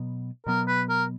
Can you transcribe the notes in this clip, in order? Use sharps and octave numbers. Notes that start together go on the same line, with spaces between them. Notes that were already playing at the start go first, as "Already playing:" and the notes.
Already playing: B2 F#3 B3
B2 F#3 B3 A#4
B4
A#4